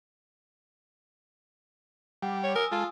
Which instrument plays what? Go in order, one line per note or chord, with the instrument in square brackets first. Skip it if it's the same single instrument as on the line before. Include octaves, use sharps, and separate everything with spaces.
[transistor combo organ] G3 [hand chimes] F#5 D6
[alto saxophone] C#5
[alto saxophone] A#4 [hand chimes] G#5 D#6 E6
[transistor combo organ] G#3 A4 [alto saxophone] F4